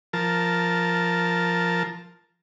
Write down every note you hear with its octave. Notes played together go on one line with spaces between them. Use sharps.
F3 A#4 A5